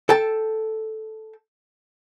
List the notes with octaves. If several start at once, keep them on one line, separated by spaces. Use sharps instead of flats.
A4 G5 A5